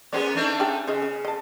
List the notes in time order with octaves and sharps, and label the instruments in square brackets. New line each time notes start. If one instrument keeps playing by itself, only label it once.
[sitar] A#3 B3 C#4 [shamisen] G#4 C5 D5
[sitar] A3 D4 D#4
[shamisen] C#4 G4 G#4
[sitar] C#3 [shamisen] C#4 G#4 D#5
[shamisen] C#4
D#5 A5